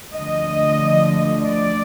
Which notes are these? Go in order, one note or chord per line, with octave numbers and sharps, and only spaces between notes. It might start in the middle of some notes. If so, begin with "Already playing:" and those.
D2 D3 F3 D#5
D5